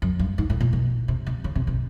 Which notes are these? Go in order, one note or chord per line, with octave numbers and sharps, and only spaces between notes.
F#2
G2
G#2
A2
A#2
B2
C3
C3
C#3
C3
B2